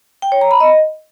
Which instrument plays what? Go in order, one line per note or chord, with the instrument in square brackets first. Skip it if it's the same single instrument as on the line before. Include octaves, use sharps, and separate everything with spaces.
[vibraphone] G5
C#5
A#5
B5
D#5